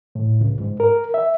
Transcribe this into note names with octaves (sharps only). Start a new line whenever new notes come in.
A2
C#2
G#2
A#4
E5